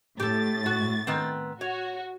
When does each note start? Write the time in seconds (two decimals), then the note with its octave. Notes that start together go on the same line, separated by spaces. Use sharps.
0.20 A2 G4 A4 A6
0.66 F#4
1.07 D#3 B3 C4
1.61 F#4 C#5